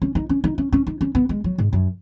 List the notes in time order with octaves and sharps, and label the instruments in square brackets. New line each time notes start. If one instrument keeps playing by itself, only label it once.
[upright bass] C#4
D#4
C#4
D#4
C#4
C#4
D#4
C#4
B3
G#3
F#3
G#2
F#2